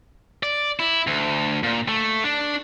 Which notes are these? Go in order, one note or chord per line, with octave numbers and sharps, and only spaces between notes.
D5
E4
D2
A#2
A3
D4